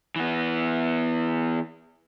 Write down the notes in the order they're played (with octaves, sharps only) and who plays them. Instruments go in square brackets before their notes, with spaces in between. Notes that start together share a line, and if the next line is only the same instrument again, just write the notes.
[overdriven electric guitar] E3 B3